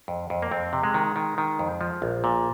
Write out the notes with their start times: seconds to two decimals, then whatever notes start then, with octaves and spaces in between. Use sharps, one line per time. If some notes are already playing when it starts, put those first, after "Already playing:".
0.08 F2
0.30 F2
0.42 A#3
0.51 F2 C4
0.73 C3
0.83 G#3
0.94 D#3
1.16 D#3
1.38 D#3
1.59 F2
1.81 F3
2.02 A#1
2.24 A#2